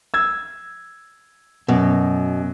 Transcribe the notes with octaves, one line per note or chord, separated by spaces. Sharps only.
E6 G#6
F#2 B2